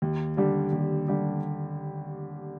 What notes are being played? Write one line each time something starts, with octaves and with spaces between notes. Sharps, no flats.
D#2
D3 G3 D4 G4
D#2
D3 G3 D4 G4